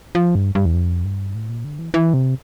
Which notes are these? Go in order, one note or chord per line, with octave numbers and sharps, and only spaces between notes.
F3
G2
G2
E2
F2
G2
A2
A#2
D3
E3
E3
C3